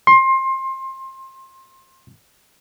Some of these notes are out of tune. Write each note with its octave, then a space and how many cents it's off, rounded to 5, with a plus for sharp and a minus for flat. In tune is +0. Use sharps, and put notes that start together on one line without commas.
C6 +25